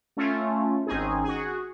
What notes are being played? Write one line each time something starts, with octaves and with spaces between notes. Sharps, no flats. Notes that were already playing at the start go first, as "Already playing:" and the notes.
A3 C#4 F4
G#1 C4 C#4 D#4 G#4
F#4 G#4